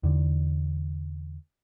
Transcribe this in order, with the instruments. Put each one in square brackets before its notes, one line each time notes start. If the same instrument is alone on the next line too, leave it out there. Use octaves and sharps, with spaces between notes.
[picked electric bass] E2 D3